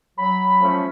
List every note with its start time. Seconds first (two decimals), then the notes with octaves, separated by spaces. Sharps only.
0.18 F#3 B5
0.61 F3 A3 C#4